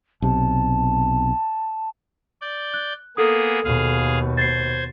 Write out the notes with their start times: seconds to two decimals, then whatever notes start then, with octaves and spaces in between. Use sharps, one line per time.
0.22 B1 C3 A5
2.41 D5 G6
2.74 F#6
3.17 A#3 B3 G#4 A4 D#6
3.64 D#2 B2 G#4 F5
4.37 C5 G#6 A6 C7